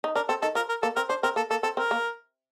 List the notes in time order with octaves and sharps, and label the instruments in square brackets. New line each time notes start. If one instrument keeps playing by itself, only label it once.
[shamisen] D#4
[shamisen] D4 [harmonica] A#4
[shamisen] C4 [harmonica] A4
[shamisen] D#3 [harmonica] A4
[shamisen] F3 [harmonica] A#4
[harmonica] A#4
[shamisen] A#3 [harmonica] A4
[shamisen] C4 [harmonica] A#4
[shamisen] D4 [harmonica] C5
[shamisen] C4 [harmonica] A#4
[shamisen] A#3 [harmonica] A4
[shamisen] A#3 [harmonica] A4
[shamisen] C4 [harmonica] A4
[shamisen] C4 [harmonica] A#4
[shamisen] A#3